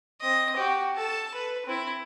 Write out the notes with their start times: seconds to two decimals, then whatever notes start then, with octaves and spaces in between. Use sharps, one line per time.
0.21 C4 D#5
0.56 F#4 G4
0.96 A4 A5
1.35 B4
1.66 C4 E4